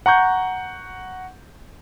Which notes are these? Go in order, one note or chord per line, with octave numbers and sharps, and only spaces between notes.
F#5 A#5 C#6 G6